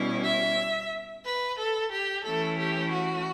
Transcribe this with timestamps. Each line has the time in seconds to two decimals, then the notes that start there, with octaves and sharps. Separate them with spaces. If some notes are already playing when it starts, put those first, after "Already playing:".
Already playing: B2 G3 C#4 E4
0.24 E5
1.24 B4
1.58 A4
1.91 G4
2.24 E3 A3 C#4 E4 A4
2.58 G4
2.92 F#4